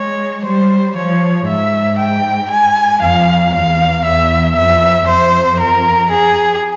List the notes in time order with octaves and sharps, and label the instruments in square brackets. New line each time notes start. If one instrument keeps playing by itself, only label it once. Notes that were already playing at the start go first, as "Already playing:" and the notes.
Already playing: [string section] G#3 [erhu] C#5
[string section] G3 [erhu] C5
[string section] F3 [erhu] C#5
[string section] G#2 [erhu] E5
[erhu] G5
G#5
[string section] F2 [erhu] F5
[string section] E2 [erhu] F5
[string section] E2 [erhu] E5
[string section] F2 [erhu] E5
[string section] F2 [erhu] C5
[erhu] A#4
G#4